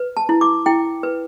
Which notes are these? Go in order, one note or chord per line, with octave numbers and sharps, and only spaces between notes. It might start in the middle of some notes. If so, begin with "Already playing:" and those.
Already playing: B4
A5
E4
D6
E4 G5
B4